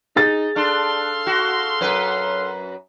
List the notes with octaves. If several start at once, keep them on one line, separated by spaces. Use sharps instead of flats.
D#4 G#4 A6
D4 A4 F5 C6
F#4
F#2 B4